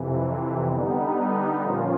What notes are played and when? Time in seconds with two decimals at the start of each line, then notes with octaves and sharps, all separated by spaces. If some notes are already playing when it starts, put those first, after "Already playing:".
Already playing: F2 C3 E3
0.67 D3 G3 B3 D#4
1.61 A#2 F3 A#3 C#4 F4